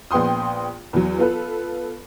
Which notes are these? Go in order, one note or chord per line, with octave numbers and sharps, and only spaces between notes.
A#1 B3 G5 C6 D#6
E2 F#3
B3 F4 A4 B4